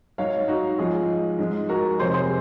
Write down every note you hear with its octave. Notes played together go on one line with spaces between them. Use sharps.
G#2 F#3 C#5 F5
D#4 F#4
G#2 F3 G#3 F4 G#4
G#2 F3 G#3
F#4 A#4
F2 C3 F#3 G#4 C5
G#4 C5